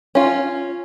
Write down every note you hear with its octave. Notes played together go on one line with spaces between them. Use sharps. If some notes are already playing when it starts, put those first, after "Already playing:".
C#4 F4